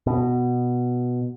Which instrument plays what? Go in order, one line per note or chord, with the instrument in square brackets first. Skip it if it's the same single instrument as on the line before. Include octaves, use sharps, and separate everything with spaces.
[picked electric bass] B2